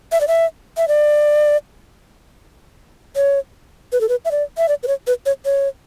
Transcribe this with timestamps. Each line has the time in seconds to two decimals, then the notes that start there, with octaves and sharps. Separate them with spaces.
0.12 E5
0.21 D5
0.28 E5
0.77 E5
0.88 D5
3.16 C#5
3.92 B4
4.01 A4
4.09 B4
4.25 E5
4.31 D5
4.58 E5
4.69 D5
4.83 B4
4.88 C#5
5.07 B4
5.26 C#5
5.45 C#5